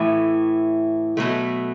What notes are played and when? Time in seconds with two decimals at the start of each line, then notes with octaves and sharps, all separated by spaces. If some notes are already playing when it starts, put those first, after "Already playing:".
Already playing: A2 E3 A3
1.17 B2 F#3 A3